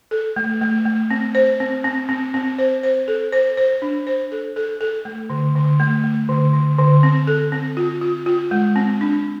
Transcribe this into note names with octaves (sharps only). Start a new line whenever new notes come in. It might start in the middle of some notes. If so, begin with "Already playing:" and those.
A4
A3
A3
A3
C4
C5
C4
C4
C4
C4
C5
C5
A4
C5
C5
D4
C5
A4
A4
A4
A3
D3
D3
A3
A3
D3
D3
D3
C4
A4
C4
F4
F4
F4
G#3
C4
D4